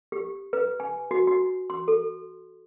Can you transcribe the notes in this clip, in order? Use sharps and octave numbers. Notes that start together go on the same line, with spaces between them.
G4
B4
G#5
F#4
F#4
C6
A4